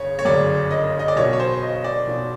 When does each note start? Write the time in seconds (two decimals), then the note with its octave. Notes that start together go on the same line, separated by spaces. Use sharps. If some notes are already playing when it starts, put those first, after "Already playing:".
Already playing: G1 C#3 C#5
0.19 C#5
0.25 G1 F#2 C#3 D5
0.71 D#5
0.99 D#5
1.08 D5
1.16 B1 B2 F#3 C#5
1.33 C#5
1.40 C5
1.62 D#5
1.84 D5
2.07 B1 B2 F#3